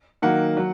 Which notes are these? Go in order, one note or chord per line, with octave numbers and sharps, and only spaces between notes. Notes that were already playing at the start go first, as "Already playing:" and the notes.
D#3 F#3 A#3 F#5
F#3